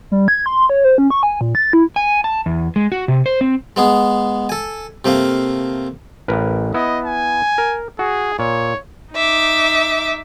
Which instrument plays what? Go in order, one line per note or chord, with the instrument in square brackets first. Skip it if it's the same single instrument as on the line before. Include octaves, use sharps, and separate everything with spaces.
[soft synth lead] G3
G#6
C6
C#5
C5
C#4
C#6
G#5
A#2
A6
E4
[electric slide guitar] G#5
A5
E2
G#3
F#4
C3
C5
C4
[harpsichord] G#3 B3 G#4
A4 G#5
C3 A3 A#3 F5
[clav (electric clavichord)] A1 A#4 B4
[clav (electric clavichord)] B3 E4 [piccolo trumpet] D#5
[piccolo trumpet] G#5
[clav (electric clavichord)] A#4
[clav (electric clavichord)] F#4 [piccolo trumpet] G#4
[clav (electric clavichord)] A#2 [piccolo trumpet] C#5
[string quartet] D#4 E5 D6